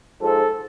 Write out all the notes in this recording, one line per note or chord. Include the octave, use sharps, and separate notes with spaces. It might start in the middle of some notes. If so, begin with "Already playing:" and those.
G#2 F3 A4